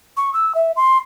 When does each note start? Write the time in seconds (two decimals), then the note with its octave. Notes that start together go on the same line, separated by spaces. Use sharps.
0.17 C#6
0.34 E6
0.55 E5
0.76 C6